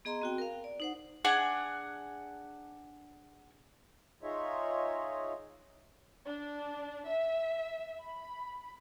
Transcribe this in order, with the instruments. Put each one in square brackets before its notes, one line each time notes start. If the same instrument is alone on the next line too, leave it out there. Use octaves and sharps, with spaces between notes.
[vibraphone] B3 G#4 D#5 A#5 C6
C4 F#4 G5
A#4 F5
D5
D#4 C5 F#5
[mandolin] D4 G#4 F#5
[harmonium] D#4 F4 G#4 C#5 D#5 E5
[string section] D4
E5
B5